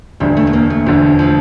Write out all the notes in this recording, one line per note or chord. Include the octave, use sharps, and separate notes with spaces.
E1 D2 D3 G3
A3
A3
A#3
A3
E1 D2 D3 F3
F3